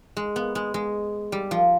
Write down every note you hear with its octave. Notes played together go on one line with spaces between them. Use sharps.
G#3
B3
G#3
G#3
G3
F3